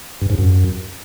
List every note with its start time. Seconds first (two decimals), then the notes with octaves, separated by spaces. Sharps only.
0.21 G2
0.30 G#2
0.38 F#2